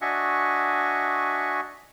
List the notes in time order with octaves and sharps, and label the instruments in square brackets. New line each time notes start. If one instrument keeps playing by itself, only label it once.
[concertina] D4 F#4 D#5 E5 G#5 C#6